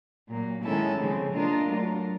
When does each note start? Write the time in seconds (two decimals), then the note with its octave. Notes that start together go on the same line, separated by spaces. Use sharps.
0.27 A#2 F#3 A#3
0.62 D#3 G#3 C#4 E4 A4
0.97 C#3 F3 G#3 C4
1.32 A#3 D4 F4 A#4 D#5
1.67 F#3 A3 D4 F4 A#4